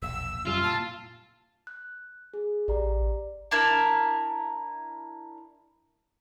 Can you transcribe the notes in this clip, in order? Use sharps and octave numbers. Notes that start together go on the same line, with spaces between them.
E1 A#1 E6
F#2 C#3 G3 F4
A#2 A5
F#6
G#4
A1 G4 D5 A#5
D4 E4 A#4